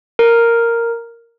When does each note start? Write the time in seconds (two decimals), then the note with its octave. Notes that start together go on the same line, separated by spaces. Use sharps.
0.19 A#4